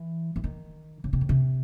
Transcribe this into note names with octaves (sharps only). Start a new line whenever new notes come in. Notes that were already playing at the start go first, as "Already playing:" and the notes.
Already playing: E3
E3
D#3
C#3
C3
A2
C3